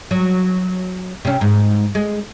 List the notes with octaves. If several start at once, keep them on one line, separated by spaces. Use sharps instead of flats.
F#3
C3 C#4
G#2
G#3